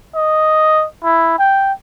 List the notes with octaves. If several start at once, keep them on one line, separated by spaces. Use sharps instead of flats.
D#5
E4
G5